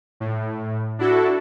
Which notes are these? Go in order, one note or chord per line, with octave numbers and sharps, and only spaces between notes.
A2
D4 E4 F#4 A4